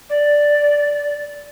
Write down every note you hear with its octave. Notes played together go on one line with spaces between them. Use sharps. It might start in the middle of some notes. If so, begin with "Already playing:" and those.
D5